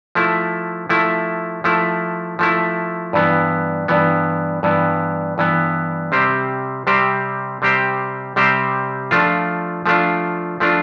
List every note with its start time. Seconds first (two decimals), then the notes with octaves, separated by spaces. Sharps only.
0.15 F3 A3 E4
0.89 F3 A3 E4
1.64 F3 A3 E4
2.39 F3 A3 E4
3.13 G2 E3 B3
3.88 G2 E3 B3
4.63 G2 E3 B3
5.38 G2 E3 B3
6.12 C3 G3 C4 G4 C5
6.87 C3 G3 C4 G4 C5
7.62 C3 G3 C4 G4 C5
8.36 C3 G3 C4 G4 C5
9.11 F3 A3 D4 F4
9.86 F3 A3 D4 F4
10.60 F3 A3 D4 F4